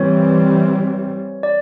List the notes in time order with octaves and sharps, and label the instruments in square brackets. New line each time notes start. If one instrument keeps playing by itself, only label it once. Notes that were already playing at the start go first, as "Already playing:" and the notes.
Already playing: [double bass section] E3 G3 C4 [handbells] C#5
[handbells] D5